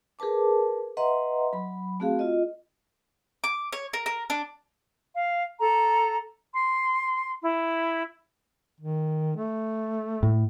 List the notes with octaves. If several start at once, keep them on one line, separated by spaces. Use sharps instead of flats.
G#4 A#4 B4 A5 D6
B4 D#5 E5 F#5 A#5 C6
F#3 B5
A3 C4 F#4 G#4 F5
F4 D#5
D6
C#5
A#4
A#4
D4
F5
A4 A#5
C6
E4
D#3
A3
A2